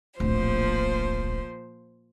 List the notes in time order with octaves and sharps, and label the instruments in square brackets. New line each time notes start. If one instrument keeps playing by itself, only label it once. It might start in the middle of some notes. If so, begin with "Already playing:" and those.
[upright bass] D1 A#1 [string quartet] A#2 F3 C5